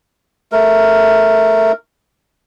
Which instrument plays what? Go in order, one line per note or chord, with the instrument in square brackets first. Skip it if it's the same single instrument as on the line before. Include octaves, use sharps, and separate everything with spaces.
[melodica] A3 A#4